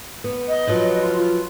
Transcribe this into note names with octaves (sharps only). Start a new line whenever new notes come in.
B3
D#5
F3 F#3 B4
F4
F4